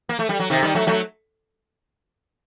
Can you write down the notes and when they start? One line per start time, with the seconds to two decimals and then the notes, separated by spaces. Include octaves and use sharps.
0.09 A#3
0.19 A3
0.29 G3
0.40 F#3
0.50 C3 D#3
0.63 D#3 G3
0.75 F#3 A3
0.87 F#3 A3